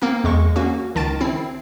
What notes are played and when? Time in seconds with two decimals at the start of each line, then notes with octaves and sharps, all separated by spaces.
0.02 A#3 C4 A#4
0.24 E2 G#3 C#6
0.56 A#3 C#4 F#4
0.95 C#2 D#3 A5 A6 D7
1.20 C4 E4 C7